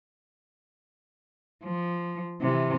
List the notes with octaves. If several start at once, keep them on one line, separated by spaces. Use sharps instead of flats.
F3
C3 E3